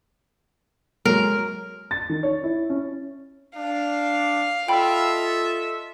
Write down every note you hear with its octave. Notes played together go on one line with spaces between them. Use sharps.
F#3 G#3 A#4
A6
D#3
C#5
E4
C#4
D4 F5
F4 A4 D#5 E5 G5 B5